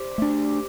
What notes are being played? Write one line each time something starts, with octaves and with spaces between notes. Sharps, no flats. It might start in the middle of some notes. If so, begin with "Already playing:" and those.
Already playing: G4 C5 D5
A3 D4